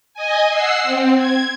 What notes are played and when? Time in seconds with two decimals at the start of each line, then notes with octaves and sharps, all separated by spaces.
0.14 D#5 G#5
0.50 F#5 E6 C7
0.82 C4
1.16 G#6